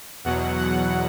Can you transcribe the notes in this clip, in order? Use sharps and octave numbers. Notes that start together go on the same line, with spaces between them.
E2 B2 F#3 F#5
F#5